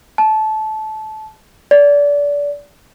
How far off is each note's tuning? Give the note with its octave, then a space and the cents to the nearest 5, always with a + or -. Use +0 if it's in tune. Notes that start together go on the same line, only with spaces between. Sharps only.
A5 -20
D5 -25